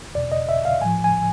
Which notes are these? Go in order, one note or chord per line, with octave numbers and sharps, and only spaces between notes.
E2 B2 D5
D#5
E5
F5
A2 F3 G#5
G#5